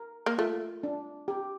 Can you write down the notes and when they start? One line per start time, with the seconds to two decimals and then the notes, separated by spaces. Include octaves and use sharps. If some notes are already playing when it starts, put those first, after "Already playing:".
Already playing: A#4
0.26 A#3
0.38 A3 F4
0.83 D4
1.28 G4